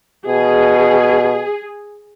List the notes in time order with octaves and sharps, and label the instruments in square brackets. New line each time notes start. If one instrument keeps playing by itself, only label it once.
[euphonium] B2 [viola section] G#4